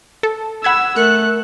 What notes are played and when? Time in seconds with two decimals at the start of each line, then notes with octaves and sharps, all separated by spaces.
0.23 A4
0.64 F#5 B5 E6 G#6
0.96 A3 A#4 F#6 C#7